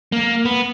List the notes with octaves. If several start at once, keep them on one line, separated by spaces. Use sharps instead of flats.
A#3
B3